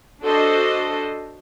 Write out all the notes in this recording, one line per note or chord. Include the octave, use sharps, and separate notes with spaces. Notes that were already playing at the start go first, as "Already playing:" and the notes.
D4 F#4 A4 C5 D#5